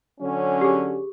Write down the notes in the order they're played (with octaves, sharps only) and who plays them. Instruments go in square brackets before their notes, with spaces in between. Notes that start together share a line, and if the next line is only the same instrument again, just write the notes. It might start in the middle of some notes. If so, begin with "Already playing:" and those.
[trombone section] D3 F#3 C#4
[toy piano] G4 G#4